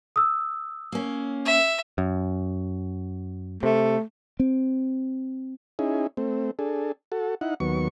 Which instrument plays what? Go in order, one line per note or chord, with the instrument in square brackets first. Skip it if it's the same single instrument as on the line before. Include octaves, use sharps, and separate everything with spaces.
[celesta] D#6 E6
[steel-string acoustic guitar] A#3 C#4
[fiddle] E5
[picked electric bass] F#2
[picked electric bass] C3 [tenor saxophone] A3
[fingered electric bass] C4
[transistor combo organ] C#4 D#4 E4 G#4
A3 C4
D4 G#4 A4
F#4 A4
D#4 E4 F#5
D#2 F#3 B3 C#6